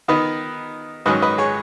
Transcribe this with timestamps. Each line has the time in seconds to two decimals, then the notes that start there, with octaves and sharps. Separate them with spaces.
0.08 D#3 B3 D#4 B4 D#5
1.06 G#2 D#3 F#3 C#4 B4 D#5
1.22 B4 D#5
1.38 G#4 C#5